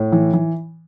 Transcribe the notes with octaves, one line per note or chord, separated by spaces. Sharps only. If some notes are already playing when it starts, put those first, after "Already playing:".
Already playing: A2
E3
E3